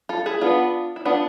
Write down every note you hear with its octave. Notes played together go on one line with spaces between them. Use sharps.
F4 A4
E4 G#4
B3 D4 F4
E4
B3 D4 F4